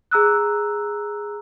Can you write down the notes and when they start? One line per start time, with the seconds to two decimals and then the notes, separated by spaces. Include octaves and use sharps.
0.11 G#4 A#5 E6 F#6